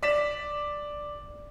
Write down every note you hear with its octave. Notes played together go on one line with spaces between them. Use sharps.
D5 B6 E7